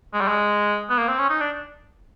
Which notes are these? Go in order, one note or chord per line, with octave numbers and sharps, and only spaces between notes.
G#3
G3
G#3
B3
A#3
C4
C#4
D#4
D4